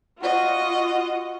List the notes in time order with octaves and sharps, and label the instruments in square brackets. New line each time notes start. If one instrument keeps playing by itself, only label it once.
[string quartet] F4 F#4 D#5